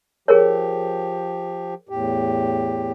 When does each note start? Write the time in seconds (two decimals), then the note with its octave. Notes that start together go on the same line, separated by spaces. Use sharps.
0.28 F3 G4 G#4 A#4 C#5
1.89 E2 A2 G4